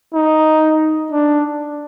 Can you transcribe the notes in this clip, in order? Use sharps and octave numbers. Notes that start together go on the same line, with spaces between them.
D#4
D4